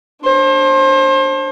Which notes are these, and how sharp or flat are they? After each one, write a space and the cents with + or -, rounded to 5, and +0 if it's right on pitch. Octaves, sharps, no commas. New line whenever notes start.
D4 +0 C5 +35